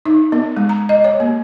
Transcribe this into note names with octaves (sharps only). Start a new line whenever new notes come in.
D#4
B3
G#3
A#5
D#5
C#5
A#3